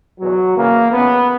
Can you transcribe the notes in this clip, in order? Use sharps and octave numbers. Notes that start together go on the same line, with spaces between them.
E2 B2 F#3
F#2 C#3 E3 A#3
F#2 C#3 E3 B3